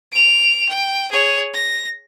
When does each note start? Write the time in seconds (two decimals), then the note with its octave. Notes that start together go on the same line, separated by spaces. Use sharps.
0.12 D7 F7
0.69 G5
1.12 G#4 C#5
1.54 A#6